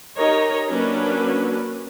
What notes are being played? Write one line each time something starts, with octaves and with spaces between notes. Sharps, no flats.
D#4 G4 A#4 C#5 D#5 A#5
F#3 A#3 C#4 D4 B4